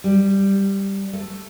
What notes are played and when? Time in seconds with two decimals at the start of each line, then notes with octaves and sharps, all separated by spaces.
0.04 G3
1.13 A3